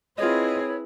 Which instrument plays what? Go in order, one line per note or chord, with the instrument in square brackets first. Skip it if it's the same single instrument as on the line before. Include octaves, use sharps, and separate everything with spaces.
[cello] C4 G#4 [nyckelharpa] E4 B4 [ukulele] F4 D#5 [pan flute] C#5